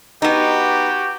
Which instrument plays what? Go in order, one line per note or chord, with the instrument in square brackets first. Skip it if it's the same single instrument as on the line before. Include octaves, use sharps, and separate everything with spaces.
[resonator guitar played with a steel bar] B3 D#4 [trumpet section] F#4 G4